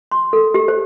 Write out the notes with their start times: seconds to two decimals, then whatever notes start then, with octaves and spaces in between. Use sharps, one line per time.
0.11 C6
0.33 A4
0.54 G4
0.68 C5